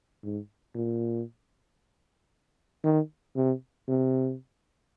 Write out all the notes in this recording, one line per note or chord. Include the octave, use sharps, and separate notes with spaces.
G#2
A#2
D#3
C3
C3